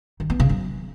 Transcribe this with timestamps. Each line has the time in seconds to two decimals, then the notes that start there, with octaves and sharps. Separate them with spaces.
0.20 D#3
0.30 B3
0.40 C#3
0.49 F#3